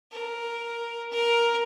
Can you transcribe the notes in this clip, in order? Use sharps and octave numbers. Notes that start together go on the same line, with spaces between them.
A#4
A#4